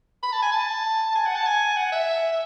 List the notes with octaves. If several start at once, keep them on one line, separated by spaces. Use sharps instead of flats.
B5
A5
G#5
A5
G#5
F#5
A5
G#5
F#5
E5